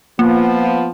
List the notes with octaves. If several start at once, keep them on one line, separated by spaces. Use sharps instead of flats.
F3 A#3 B3 F4